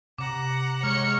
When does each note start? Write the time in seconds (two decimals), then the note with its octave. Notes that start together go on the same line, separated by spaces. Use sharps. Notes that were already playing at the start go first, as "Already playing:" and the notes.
0.18 C3 F#5 A#5 D6
0.84 G#3 C#5 F6 C#7